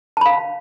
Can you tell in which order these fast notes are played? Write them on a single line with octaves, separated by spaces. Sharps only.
A5 B5 F5